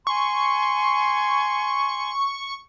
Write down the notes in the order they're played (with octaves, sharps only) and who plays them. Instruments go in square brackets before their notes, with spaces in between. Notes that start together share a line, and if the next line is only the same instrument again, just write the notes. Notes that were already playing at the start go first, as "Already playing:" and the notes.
[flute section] G#5 C6 [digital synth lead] C#6